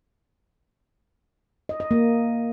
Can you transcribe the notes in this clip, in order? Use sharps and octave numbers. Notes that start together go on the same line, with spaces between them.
D#5
D#5
A#3